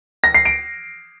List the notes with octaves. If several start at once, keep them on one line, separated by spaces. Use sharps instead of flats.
A#6
C7
D7